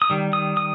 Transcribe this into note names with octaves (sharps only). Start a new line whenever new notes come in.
D#6
D#3 G3
D#6
D#6